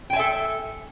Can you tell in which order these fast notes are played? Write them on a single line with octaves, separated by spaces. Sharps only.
G5 G#5 E5 A4